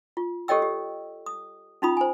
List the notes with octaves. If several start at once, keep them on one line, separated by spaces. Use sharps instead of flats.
F4
G4 A4 C#5 D#5 G5 E6
G4
D#6
C#4 D#4 F4 B5 D#6
C5 G#5